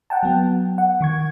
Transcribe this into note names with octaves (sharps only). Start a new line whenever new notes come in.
F#5 G5 A5
F#3 B3
F#5
D#3 C#6 G#6